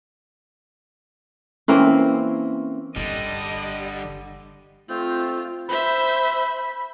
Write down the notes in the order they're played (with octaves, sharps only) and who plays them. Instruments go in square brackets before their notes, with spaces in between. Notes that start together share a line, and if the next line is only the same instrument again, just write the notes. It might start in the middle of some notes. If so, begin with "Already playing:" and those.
[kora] E3 A#3 C4 [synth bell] C#4
[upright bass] G1 [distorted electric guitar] D3 [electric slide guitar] G3 [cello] D#5
[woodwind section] F2 A3 C4 [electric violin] F4
[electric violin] C5 E5 [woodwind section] B5